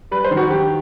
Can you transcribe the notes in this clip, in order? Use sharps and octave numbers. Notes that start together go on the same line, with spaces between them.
G3 B4
C5
D#3
F#4
D#3 G4